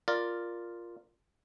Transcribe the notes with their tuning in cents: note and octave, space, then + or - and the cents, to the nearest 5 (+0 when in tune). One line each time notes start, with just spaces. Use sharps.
F4 +0 A#4 +0 D5 +0